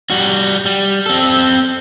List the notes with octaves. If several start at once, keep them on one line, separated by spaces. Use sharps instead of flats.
G3 F#4
G3
C4 A4